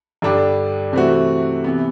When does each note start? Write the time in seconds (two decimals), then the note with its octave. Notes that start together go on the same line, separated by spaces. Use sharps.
0.22 G2 D3 G3 D4 G4
0.93 C3 E3 A3 C4 F#4
1.64 C3 E3 B3